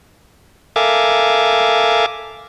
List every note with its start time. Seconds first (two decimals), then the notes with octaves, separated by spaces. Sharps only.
0.76 A4 A#4 E5 F5 G#5 D6